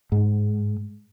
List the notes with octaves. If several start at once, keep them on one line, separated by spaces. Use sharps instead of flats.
G#2